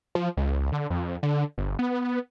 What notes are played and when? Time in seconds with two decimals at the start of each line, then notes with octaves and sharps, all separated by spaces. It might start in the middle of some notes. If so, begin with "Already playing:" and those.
0.15 F3
0.37 C#2
0.72 D3
0.90 F2
1.23 D3
1.58 G1
1.79 B3